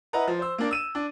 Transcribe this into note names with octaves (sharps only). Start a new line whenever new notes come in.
E4 B4 D#5 F#5 A#5
F3
C5 E6
A#3 D4
E6 D#7 E7
D4